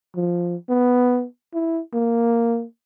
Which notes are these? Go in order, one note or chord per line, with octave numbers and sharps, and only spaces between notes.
F3
B3
E4
A#3